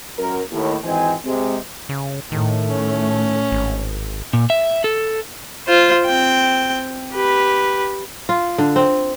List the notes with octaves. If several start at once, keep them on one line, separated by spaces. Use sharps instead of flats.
F#2 A#4
D#2 A2
G#1 E3 C4 C5 D#5 G#5
C3 G#3
C#3
A2 D#3 A3
C#4
G#1
A#2
E5
A4
F4 C5
C4 G5
G4 B4
F4
D3
C4